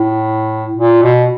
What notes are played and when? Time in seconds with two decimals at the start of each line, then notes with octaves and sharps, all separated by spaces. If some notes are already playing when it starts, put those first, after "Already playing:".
Already playing: A2
0.77 A#2
1.02 B2